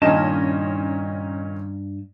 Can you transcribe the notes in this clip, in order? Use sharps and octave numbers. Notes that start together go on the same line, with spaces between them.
G2 A#2 D#3 C#4 D#4 D#5 A5